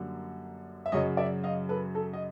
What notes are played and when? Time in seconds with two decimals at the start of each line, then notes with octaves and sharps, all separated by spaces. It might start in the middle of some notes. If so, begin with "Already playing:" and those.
Already playing: F#2 D3 G3 A#3
0.86 E5
0.92 F#2 C#3 F#3 C#5 D#5
1.17 D5 E5
1.44 D#5 F5
1.69 A4 B4
1.95 A4
2.13 D#5